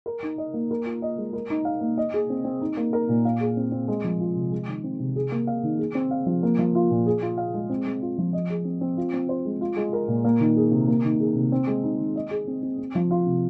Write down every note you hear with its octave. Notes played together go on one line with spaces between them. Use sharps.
A#4
D#4
D#5
A#3
A#4
F4
D#5
G#3
A#4
D#4
F5
A#3
D#5
G#4
C4
C4
D#4
A#3
A#4
A#2
F5
G#4
C4
C4
G#3
F3
F4
C3
G#3
D#3
C4
C3
G#4
A#3
F5
D#3
G#4
C4
F5
F3
A#3
F3
F4
A#2
G#4
F4
F5
G#3
C4
G#3
F4
F3
D#5
G#4
C4
C4
F4
C4
C5
G#3
F4
G#3
A#4
A#2
A#3
D#3
G#4
C3
A#3
D#3
G#4
C3
C4
G#3
D#4
D#3
D#5
G#4
C4
C4
C4
F3
F4
C3